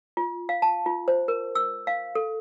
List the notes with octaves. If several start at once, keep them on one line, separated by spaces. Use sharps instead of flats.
F4
F5
A5
F4
C5
A#4
E6
F5
A4